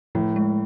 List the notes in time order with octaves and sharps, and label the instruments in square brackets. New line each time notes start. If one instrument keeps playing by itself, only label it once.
[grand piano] A2 [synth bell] F3
[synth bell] G#3